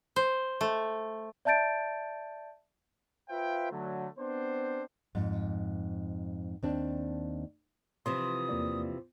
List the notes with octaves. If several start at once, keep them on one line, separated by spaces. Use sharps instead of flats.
C5
A3
D5 E5 A5 G6 A6 D7
F4 B4 C5 E5 F5 G5
D3 F#3 A3
B3 C4 D4 C5
F2 G#2
D#2 C4 D4
C3 E3 F3 C6 D#6
E2 A#3 D5